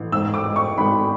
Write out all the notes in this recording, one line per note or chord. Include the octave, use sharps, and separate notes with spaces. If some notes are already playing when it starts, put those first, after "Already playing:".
Already playing: A1
G#2 E6
D6
G#3
C#6
G#1 B5